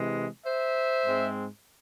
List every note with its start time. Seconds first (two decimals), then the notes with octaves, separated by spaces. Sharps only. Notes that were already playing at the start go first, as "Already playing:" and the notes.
Already playing: C3 E3 G#3
0.45 C5 E5
1.06 G#2 G#3 C4